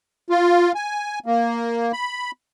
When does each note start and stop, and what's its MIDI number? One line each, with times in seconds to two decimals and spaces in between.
0.30 0.72 65
0.75 1.19 80
1.26 1.92 58
1.93 2.31 83